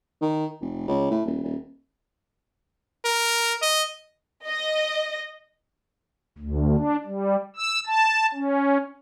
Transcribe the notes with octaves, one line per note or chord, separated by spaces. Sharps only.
D#3
F1
C#2
A2
D#1
D#1
A#4
D#5
D#5
D2
D4
G3
E6
A5
C#4